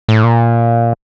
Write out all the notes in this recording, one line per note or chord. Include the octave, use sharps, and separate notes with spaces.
A2
A#2